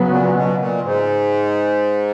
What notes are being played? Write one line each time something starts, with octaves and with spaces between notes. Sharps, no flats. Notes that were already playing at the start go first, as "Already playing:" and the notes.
Already playing: C#3 F#3 B3
A#2
B2
A#2
G#2